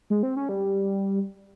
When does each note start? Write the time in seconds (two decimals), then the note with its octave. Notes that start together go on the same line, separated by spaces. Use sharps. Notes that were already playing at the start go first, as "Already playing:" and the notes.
0.10 G#3
0.23 C4
0.36 C#4
0.49 G3